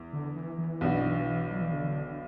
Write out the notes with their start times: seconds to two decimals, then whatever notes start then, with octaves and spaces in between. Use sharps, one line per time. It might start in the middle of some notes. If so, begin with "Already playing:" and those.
Already playing: E2
0.13 D3
0.35 E3
0.58 E3
0.81 B1 B2 B3 D4 F#4
1.50 F#3
1.62 E3
1.73 D3